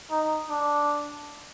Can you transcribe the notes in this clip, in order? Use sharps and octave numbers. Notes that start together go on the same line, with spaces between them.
D#4
D4